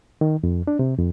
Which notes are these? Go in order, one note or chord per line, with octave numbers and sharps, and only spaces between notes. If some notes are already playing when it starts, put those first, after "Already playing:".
D#3
F2
D4
C3
F2